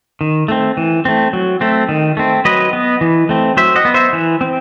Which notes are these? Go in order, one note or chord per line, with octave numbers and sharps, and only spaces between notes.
D#3
A3 C4
E3
A3 C4
F#3
A3 C4
D#3
A3 C4
F#3 B4 D#5
B3
E3
A3 C4
F#3 C5 E5
D#5 F#5
B3
C5 E5
E3
C4